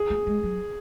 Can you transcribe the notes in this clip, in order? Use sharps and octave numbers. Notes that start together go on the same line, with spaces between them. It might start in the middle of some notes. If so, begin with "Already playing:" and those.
Already playing: G#4
A#3
G#3
F#3